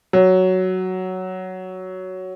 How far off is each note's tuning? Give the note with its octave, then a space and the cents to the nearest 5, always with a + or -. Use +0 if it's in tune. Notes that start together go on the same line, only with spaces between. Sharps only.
F#3 +5